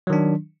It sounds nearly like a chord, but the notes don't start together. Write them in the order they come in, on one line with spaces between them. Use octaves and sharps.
F#3 D#3 D4